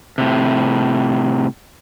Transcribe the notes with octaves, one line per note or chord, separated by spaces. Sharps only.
A2 C3